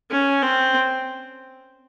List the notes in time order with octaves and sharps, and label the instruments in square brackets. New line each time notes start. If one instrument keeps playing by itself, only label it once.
[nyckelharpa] C#4
C4